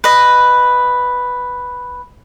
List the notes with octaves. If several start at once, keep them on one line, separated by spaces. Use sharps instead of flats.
B4 D#5